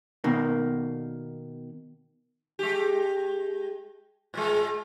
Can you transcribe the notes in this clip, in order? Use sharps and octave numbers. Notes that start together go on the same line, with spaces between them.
B2 D#3 A#3
G#3 G4
A2 G#3